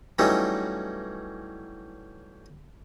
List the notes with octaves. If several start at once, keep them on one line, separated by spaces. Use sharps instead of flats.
E3 F#3 G3 A3 C#4 D#4